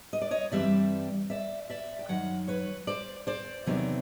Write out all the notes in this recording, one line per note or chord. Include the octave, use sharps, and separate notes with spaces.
D#5
D5
C#5 D#5
G2 E3 G3 C4 D5 E5
D5 E5
D5 E5
G5
F#2 D#3 F#3 F#5
B4 C#5
C5 D5
C5 D5
E2 C3 D#3 F#3 A3